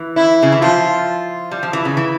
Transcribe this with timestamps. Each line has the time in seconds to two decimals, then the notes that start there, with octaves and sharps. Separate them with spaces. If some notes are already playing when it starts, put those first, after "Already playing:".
Already playing: E3
0.16 E4
0.43 C#3
0.52 E3
0.62 F3 F4
1.51 G3
1.63 F3
1.73 E3
1.85 C#3
1.97 E3